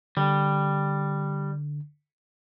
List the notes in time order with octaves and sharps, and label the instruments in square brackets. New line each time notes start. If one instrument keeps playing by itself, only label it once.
[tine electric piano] D3 [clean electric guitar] G3